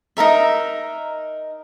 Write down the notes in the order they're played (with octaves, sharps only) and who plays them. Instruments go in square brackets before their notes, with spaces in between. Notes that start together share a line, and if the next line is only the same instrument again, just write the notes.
[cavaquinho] D#4 E4 A#4 E5